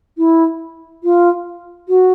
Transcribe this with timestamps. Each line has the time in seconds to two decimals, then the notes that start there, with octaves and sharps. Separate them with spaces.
0.18 E4
1.03 F4
1.88 F#4